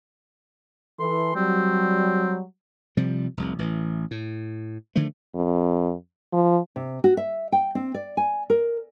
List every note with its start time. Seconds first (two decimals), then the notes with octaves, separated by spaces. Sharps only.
1.00 E3 A4 C6
1.36 F#3 G3 C4
2.97 C3 F3 G3
3.37 F1 C2
3.59 A1 E3
4.11 A2
4.96 D3 D#3 F3 A3
5.35 F2
6.33 F3
6.76 C3
7.04 F#4
7.17 E5
7.52 G5
7.75 C4
7.94 D5
8.17 G#5
8.50 A#4